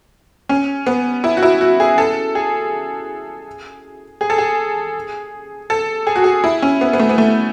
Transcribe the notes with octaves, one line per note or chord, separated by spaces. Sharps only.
C#4
B3
E4
F#4
E4
F#4
G#4
A4
G#4
G#4
A4
G#4
A4
G#4
F#4
G#4
E4
C#4
B3
B3
A3
B3
A3